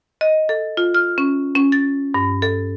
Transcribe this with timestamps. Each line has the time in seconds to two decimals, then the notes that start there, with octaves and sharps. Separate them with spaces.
0.21 D#5
0.49 A4
0.77 F4
0.94 F6
1.18 C#4
1.55 C#4
1.72 A6
2.14 G2
2.42 A4